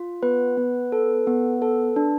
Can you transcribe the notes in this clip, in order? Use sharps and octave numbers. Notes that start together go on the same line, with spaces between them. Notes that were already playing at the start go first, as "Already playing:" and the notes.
Already playing: F4
B3 B4
B3
A4
B3
A4
D4